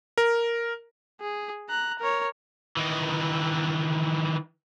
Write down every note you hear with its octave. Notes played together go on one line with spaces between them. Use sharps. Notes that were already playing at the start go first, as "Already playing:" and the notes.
A#4
G#4
A#5 F#6
A#4 C#5
D#3 E3